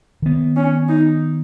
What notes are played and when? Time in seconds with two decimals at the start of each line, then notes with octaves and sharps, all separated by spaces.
0.22 D#3 B3
0.56 C#4
0.89 D#4